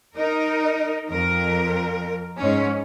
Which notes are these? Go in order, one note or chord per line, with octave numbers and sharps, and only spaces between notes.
D#4 A#4
F2 A#4
G#2 C#4